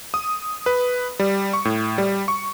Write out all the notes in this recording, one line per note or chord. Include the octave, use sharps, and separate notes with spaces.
D#6
B4
G3
C#6
A2
G3
C#6